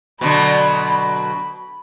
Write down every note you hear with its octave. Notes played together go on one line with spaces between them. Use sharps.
B2 D3 F#3 B5